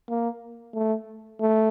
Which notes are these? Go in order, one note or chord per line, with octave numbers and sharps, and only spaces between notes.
A#3
A3
A3